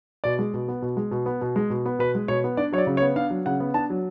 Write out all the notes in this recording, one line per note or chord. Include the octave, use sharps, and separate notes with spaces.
B2 D5
G#3
B2
B3
B2
G#3
B2
B3
B2
G#3
B2
B3
B2 B4
G#3
B2 C#5
B3
D4 D5
F#3 C#5
D5
C#3
C#5
B3
D4 F5
F#3
C#3 F#5
B3
D4 A5
F#3